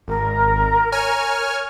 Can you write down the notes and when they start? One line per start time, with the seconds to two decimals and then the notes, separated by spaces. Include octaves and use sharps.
0.08 G#1 A#4
0.92 C#5 G#5 F6